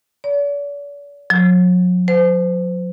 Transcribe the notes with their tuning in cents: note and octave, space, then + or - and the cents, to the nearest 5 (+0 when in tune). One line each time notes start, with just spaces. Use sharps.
D5 -45
F#3 -40
C5 -30